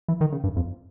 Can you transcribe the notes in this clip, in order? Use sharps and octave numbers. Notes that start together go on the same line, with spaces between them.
E3
D#3
C#3
G2
F2